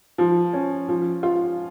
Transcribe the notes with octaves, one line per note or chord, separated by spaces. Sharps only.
F3
C#4
F3
F4